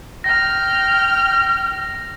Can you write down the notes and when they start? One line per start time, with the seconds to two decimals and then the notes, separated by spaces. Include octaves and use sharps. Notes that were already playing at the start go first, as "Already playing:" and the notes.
0.24 G5 F6 A#6